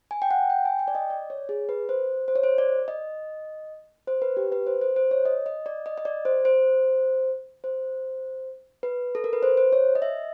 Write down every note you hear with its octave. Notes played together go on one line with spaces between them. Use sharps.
G#5
G5
F#5
G5
G#5
G5
D5
D#5
D5
C#5
G#4
B4
C5
C5
C#5
C5
D5
D#5
C5
B4
G4
B4
C5
C5
C5
C#5
D#5
D#5
D5
D#5
D#5
D5
C5
C5
C5
B4
A4
A#4
B4
C5
C5
C#5
D#5
E5